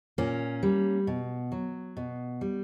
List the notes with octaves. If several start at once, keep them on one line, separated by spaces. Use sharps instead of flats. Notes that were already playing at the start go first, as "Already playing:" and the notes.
A#2 A#3 C#4
G3
B2
F#3
B2
G3